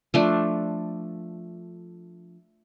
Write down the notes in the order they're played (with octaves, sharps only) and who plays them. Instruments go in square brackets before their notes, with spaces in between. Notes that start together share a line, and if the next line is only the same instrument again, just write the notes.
[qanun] F3 A3 D4